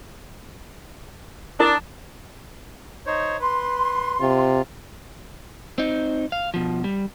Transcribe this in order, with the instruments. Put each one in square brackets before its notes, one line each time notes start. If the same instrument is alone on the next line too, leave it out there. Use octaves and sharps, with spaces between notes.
[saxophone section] D4 [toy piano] E4 A#4 D#6
[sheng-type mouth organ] D#4 C5 C#5
[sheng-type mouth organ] B4 [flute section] C6
[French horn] C3 [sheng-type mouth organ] F4
[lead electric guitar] C4 D#4
F5
B2 F3
G3